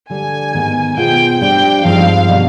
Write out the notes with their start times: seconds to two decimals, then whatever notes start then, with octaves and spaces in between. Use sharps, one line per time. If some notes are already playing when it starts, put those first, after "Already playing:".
0.10 D3 G3 D4 G#5
0.54 G#2 D#3 B3
0.97 B2 B3 F4 G#4 C5 G5
1.40 G3 D4 G4 C5 G5
1.84 G2 F3 G#3 C4 D#4 F5
2.27 B2 G3 B3 D4